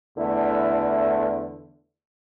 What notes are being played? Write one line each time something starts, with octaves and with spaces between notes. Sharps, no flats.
E2 D3 A3 E4